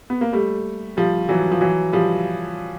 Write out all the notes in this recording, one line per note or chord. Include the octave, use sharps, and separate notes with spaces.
B3
A#3
G3 A3
F3 G3
E3 F#3
F3
E3 F#3
F3 G3